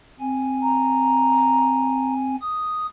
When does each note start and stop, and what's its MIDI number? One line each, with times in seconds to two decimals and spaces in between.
0.20 2.36 60
0.20 2.36 80
0.62 2.14 82
2.41 2.86 87